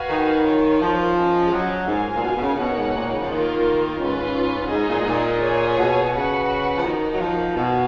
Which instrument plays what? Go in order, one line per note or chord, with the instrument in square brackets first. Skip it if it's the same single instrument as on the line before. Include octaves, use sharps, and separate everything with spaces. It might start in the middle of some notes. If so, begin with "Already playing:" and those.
Already playing: [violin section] F#4 B4 F5 G#5
[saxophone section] D#3
[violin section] F4 A#4 C#5
[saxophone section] F3
[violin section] C#4 G#4 D#5
[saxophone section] G#3
F#3
[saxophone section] G#2 [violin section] F4 A#4 F5 G#5
[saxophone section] A#2
B2
B2
C#3
C#3
[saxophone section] B2 [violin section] A#3 D#4 A#4 C#5 F#5
[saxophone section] G#2
B2
A#2
C#3
F3
[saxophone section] D#3 [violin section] A#3 F4 A#4
[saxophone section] G#2 [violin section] C#4 F4 B4
[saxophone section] G#2 [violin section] D#4 G#4 D#5
[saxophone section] A#2
G#2
A#2
[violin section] G#4 C#5 G#5
[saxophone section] B2
[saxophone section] C#3 [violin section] F#4 B4 F#5
[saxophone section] F3
[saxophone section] D#3 [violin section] A#3 D#4 F#4
[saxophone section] F#3
F3
[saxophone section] B2 [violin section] F5 G#5